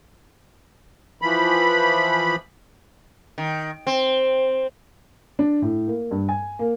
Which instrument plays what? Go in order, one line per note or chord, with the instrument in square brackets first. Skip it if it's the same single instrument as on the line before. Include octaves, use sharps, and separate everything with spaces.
[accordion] E3 F3 B5
[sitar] D#3
C4
[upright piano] D4
A2
A#3
G2
G#5
A#3